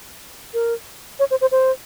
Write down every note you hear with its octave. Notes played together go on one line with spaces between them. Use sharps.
A#4
C#5
C5
C5
C5